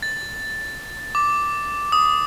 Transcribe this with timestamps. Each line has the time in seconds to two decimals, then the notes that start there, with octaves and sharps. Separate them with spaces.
0.02 A6
1.15 D6
1.92 D#6